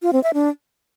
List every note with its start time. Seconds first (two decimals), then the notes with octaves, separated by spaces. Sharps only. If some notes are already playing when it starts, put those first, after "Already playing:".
0.02 F4
0.13 C4
0.23 E5
0.34 D4